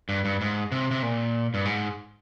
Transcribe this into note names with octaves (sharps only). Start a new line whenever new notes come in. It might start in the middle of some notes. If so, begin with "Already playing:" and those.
G2
G2
G#2
C3
C3
A#2
G2
G#2